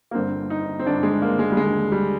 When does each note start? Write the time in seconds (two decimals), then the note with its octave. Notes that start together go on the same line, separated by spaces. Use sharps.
0.11 A#3
0.14 G1 G2 D3 C4
0.50 D#4
0.79 C4
0.86 G1 G2 D3 D4
1.03 G#3
1.22 A#3
1.39 G#3
1.52 G3
1.57 D#2 D3 G#3
1.92 G3